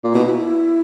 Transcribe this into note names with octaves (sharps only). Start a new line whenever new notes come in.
A#2
B2 E4
D#4
E4